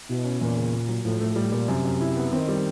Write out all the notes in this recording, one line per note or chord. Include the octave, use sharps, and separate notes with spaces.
B2 E4
C#4
E2 A#2
C#3
A#3
F#3
A2 F3
A2 A3
A2 G3
A#2 G3
F#2 C3
F#2
E4
B3
D#3 C4
G3